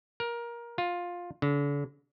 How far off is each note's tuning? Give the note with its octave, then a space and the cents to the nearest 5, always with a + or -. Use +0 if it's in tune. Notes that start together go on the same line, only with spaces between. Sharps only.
A#4 +20
F4 +10
D3 -40